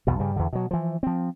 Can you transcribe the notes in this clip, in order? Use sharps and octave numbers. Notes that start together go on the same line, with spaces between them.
B1 E2 B2
G2 C#3 G3
E2 D3
B2 F#3
E3 F3
F3 C4